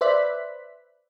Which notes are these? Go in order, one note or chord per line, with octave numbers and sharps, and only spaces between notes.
B4 C5 D5 E5 F#6 B6